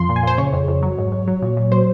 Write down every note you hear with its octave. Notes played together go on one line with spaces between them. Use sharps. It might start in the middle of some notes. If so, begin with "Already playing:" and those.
Already playing: F2 F3 C6
A#2
G#5
A#2 C5
C#3 C#5
F2
F2
F#3
G#2
G#2
F#3
A#2
A#2
F#3 C5